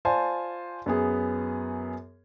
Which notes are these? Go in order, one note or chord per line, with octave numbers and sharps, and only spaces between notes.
F4 C5 D5 G#5 A5
F#2 B3 G#4